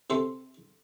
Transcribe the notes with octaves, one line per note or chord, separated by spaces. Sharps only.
C3 A4 C6